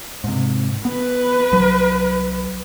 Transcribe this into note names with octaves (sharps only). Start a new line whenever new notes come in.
G#2 C3
B3 B4
C2 F#3